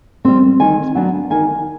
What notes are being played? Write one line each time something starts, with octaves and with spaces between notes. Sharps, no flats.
G3 C4
D#3 G#5
F#3 B3 D4
D#3 G#5